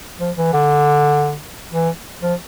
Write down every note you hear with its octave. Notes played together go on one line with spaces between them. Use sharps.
F3
E3
D3
E3
F3